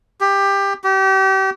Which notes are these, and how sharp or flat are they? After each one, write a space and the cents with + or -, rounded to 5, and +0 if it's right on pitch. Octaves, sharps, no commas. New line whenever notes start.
G4 +15
G4 -35